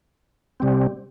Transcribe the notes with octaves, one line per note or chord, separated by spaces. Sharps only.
C3 G3 C4